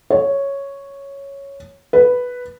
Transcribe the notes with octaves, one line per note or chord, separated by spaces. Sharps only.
C#5
B4